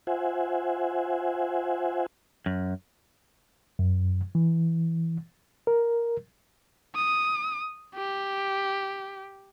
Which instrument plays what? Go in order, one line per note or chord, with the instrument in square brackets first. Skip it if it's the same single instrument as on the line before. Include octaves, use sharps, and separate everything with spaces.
[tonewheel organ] F4 C5 E5 F#5 G#5
[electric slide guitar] F#2
[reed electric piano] F#2
E3
A#4
[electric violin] D#6
G4